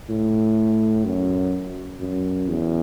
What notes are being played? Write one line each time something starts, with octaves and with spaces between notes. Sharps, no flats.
A2
F#2
F#2
E2